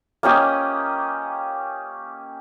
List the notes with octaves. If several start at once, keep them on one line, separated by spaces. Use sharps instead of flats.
A#3 C#4 G4 D#5